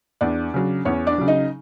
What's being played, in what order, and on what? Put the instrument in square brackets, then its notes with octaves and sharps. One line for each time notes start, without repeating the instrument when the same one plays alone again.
[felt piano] E2 D4 D5
C#3 F#3
E2 C#4 C#5
D4 D5
C#3 F#3
D#4 D#5